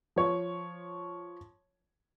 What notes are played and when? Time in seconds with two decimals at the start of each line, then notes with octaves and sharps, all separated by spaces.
0.16 F3 C#5